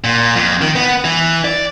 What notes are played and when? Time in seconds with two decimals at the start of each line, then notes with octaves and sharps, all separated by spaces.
0.04 A#2
0.36 F2
0.61 D#3
0.75 B3
1.05 E3
1.45 D5